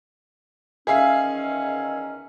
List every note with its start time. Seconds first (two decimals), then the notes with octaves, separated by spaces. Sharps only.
0.87 E2 D#3 C#4 G#4 E5 F5